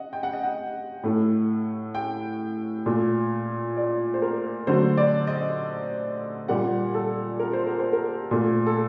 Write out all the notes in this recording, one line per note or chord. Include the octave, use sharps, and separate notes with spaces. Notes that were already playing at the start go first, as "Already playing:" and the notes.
Already playing: D#5 F#5
G5
F#5
D#5
F#5
A2 A3
G5
A#2 A3
D5
C5
A#4
D3 F#3 A3 C5
D5
D#5
A#2 G3 A#3 F#5
A4
A#4
C5
A#4
C5
A#4
A#2 A3
A4